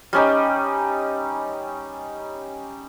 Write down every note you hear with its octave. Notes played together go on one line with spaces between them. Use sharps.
G3 C#4 D#4